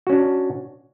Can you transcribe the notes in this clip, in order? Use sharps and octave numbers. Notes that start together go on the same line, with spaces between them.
C#4 D4 F#4